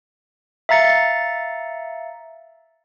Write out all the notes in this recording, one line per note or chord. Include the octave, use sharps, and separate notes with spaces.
E5 F5 A#5 A6 C#7